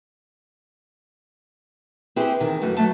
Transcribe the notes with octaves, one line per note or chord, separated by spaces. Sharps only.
C4 E4 G4 G#4 B4 C5
C3 D#3 E3
F#2 E3 G#3 A3 F#4
F#3 A3 A5